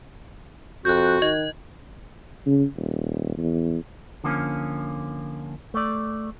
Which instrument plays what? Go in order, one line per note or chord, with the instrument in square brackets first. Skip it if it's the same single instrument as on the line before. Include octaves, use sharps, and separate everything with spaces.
[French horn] F2 [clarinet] F#4 [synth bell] F#6 G6
[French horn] D#3 [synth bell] D#5
[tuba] C#3
D#1
E2
[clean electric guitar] D3 F3 A#3 C4 C#4
A3 D5